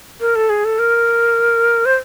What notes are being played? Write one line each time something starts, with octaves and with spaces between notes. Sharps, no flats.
A#4
A4
G#4
A4
A#4
C5